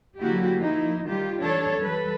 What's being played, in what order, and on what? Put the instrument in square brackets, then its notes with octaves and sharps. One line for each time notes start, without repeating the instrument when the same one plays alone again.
[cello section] D3 F#3 A#3 E4 F#4 G4
F3 A#3 D#4 E4
D#3 G3 F4 G4
E3 D4 A4 C#5
E3 G3 A4 B4